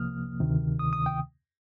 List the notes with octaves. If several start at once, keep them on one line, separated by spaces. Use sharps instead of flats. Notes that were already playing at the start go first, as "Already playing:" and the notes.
Already playing: C2 C3 F3 A#3 D#6 F6
D2 C3 D#3
D#6
D#6
G5